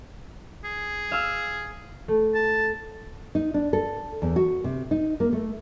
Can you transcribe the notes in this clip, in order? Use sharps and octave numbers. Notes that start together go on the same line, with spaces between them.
G#4
F5 E6 F6
A3
A5
D#4
D4
A4
E2
F#4
C3
D#4
A#3
A3